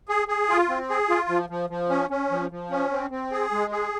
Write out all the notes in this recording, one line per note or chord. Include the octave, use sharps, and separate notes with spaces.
G#4
G#4
F4
C4
G#4
F4
F3
F3
F3
C#4
C#4
F3
F3
C#4
C4
C4
G#4
G#3
G#4